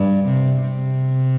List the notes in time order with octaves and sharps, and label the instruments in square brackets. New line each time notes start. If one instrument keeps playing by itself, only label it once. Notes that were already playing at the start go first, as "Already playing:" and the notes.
Already playing: [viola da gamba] G2
C3
C3